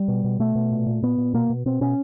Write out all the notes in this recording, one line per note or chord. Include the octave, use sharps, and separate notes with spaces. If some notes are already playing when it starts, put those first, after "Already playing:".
Already playing: G3
B2
B2
B2 A3
B2
A#2
A#2
A#2 B3
A#2
B2 A#3
B2
B2 C4
B2 C#4